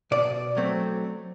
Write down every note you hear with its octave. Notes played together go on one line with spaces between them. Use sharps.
B2 D5
F#3 A3 C4